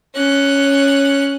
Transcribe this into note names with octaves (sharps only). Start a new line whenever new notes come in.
C#4 F#6